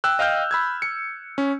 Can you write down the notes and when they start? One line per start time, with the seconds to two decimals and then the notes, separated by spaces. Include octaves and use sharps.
0.04 G5 E6 F#6
0.19 D#5 F5 G5 F6 G6
0.51 B5 E6 G#6
0.82 C#7
1.38 C#4